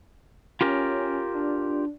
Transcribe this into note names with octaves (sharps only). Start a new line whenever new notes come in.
C#4 F4 G4 A#4
D4